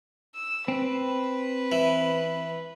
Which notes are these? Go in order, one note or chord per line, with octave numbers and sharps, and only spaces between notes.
E6
C4 B4
E3